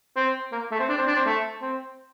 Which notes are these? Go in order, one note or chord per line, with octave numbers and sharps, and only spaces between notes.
C4
A#3
A3
C4
D4
C4
D4
C4
A3
C4